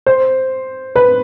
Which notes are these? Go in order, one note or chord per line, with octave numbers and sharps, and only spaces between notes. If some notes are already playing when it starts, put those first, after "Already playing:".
C5
B4